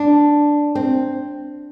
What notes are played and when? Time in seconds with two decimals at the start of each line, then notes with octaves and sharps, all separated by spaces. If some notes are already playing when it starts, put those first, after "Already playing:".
Already playing: D4
0.75 C4